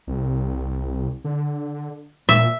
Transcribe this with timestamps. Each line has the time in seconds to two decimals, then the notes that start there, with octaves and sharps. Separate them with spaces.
0.07 C2
1.24 D3
2.29 A#2 E5